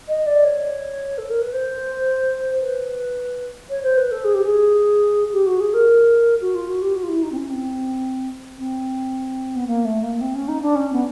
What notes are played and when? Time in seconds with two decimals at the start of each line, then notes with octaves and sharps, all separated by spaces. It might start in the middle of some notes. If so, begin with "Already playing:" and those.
0.08 D#5
0.26 D5
0.44 C#5
1.18 A4
1.29 A#4
1.41 B4
1.53 C5
2.61 B4
3.70 C#5
3.83 C5
3.97 B4
4.11 A4
4.24 G#4
4.34 G4
4.44 G#4
5.33 G4
5.46 F#4
5.60 G#4
5.73 A#4
6.41 F#4
6.54 F4
6.68 F#4
6.82 G4
6.95 F#4
7.02 F4
7.08 E4
7.22 D#4
7.31 C4
7.36 C#4
7.50 C4
8.58 C4
9.55 B3
9.67 A#3
9.84 A3
10.03 A#3
10.21 C4
10.35 C#4
10.48 D#4
10.62 D4
10.75 C#4
10.92 B3